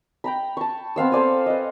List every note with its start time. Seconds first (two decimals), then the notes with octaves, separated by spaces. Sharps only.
0.24 G5 A#5 B5
0.57 A5 C#6
0.96 B3 C4 F5 E6
1.12 A4 C5 D5 G#5
1.46 B4 D#5